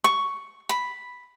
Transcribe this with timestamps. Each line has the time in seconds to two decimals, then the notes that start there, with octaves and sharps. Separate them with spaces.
0.04 C#6
0.69 B5